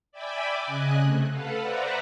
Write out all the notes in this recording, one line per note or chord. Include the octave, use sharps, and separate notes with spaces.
D5 E5 G5 G#5 B5 D6
C#3 D#5 G#5 F#6
C3 A3
A4 B4 F5 F#5
B4 C5 D5 E5 F#5 A#5